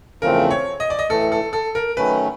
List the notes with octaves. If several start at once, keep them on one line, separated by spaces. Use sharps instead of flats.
E2 C#3 F3 A3 C4 A#4
C#5
D#5
D5
D#5
A2 E3 A3 A4
A4
A4
A#4
D#3 F#3 A3 C#4 B4